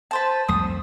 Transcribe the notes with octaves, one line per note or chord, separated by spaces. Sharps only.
B4 C5 A5
C2 F2 A3 D#6